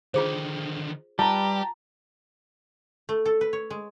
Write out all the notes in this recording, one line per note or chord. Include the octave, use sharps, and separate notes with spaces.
D3 D#3 F4 G#4 C5
G3 F4 G4 B4 A5 A#5
A3
A4
B4
C#5
G#3